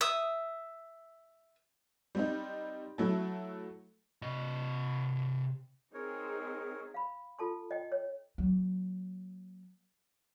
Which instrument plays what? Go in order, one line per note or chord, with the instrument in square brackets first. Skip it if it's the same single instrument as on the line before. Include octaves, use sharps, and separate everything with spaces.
[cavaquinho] E5 D#6
[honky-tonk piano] G3 C4 D#4
F#3 A3 E4
[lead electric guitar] C3 D#5
[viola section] C4 D#4 G#4 [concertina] A#4 C#5
[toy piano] F5 B5
F4 A4 A5 C6
D#5 G5
C#5
[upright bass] F#3 A#3